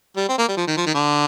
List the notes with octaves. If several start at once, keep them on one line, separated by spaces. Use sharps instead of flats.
G3
C4
A#3
G3
F3
D#3
F3
D#3
D3